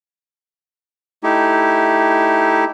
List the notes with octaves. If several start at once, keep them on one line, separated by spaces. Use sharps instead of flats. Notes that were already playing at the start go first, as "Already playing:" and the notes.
A3 D#4 E4 G4